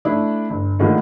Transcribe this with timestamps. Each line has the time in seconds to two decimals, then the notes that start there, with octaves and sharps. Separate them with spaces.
0.05 A3 D4 E4
0.50 G1
0.79 A2 D3 D#3 F3 G#3 A#3